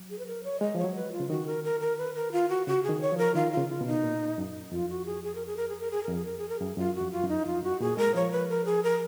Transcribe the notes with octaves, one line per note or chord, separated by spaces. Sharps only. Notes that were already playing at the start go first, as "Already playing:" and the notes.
Already playing: F#3
G#4
B4
A#4
C#5
G#3 D#5
F3 C#5
F#3
B4
F4
C#3
D#3 F#4
A#4
A#4
A#4
B4
A#4
F4
F#4
C#3 F#4
G#4
D#3
C#5
F3
A#4
D#3 F4
F4
C#3
F4
B2
D#4
A#2
F#2
F2 F4
F#4
G#4
G#4
A#4
G#4
A#4
G#4
A#4
G#4
F2 A#4
G#4
A#4
G#4
A#4
F#2 G#4
F#2 F4
F#4
F2
F4
F#2
D#4
F2 F4
F#2 F#4
A#2 G#4
G#3 A#4
F3 C#5
B4
A#4
G#4
A#4